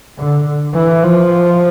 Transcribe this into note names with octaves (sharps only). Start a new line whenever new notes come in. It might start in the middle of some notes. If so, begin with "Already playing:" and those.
D3
E3
F3